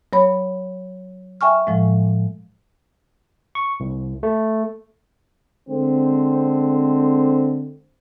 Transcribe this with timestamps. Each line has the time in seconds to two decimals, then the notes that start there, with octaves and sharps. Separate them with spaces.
0.13 F#3 C#5 B5
1.41 E5 G5 G#5 C#6 F6
1.67 A2 F3 G#3
3.55 C#6
3.80 C2
4.23 A3
5.70 D3 G#3 C4